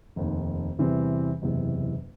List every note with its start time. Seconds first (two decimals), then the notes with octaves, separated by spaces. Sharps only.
0.16 F1 D#2 D#3
0.79 E2 C3 E3 G3 C4
1.42 F#1 E2 C3